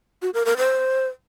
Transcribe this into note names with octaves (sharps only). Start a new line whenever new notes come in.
F#4
A#4
A#4
C5